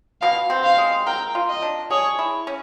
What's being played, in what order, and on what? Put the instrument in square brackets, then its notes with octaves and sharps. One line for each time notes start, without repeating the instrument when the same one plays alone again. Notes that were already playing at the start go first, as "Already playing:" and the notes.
[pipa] B2 [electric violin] F5
[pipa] C4
[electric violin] F5
[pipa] G#3
[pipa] A#4 [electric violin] G5
[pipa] F4
[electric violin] D#5
[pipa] D4
[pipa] G#4 [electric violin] C#5
[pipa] E4
C#4